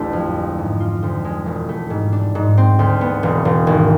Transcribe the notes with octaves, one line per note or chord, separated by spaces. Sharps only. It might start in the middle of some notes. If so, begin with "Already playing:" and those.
Already playing: A1 D2 A3 D4
F2
G#3
G#2
F4
D2
G#3
E1
A3
G#2
D4
G#2
C4
D2
B3
E1
E1
G#1